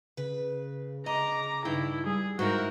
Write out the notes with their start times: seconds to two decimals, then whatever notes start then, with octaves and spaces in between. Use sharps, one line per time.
0.17 C#3 B4
1.06 D#5 A#5 D6
1.65 G2 D#3 E4 G5
2.06 G3 G#4
2.39 G#2 C#3 E4 F#4 A#4 G6